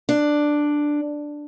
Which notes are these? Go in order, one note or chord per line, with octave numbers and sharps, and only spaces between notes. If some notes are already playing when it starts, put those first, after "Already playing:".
D4